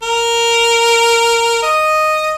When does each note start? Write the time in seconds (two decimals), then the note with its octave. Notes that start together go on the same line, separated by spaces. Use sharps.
0.03 A#4
1.63 D#5